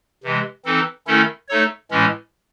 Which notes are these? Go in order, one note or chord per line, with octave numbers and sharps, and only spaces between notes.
C3 E3 G#3
E3 C4 D#4 A4
D#3 A3 C#4 E4 A4
A3 D#4 A4 C#5
A2 E3 G#3 C#4